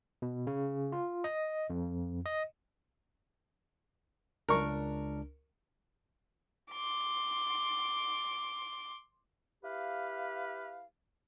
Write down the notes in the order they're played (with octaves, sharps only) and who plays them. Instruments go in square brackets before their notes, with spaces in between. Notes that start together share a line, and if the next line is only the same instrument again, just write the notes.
[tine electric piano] B2
C#3
F4
D#5
F2
D#5
[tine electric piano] C#2 D4 [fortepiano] A#4 C#6
[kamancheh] C6 D6
[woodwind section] E4 G4 B4 F5